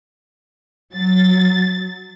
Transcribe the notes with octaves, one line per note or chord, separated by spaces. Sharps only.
F#3 A6